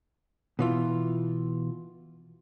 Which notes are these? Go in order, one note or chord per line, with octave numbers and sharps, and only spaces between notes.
B2 E3 F4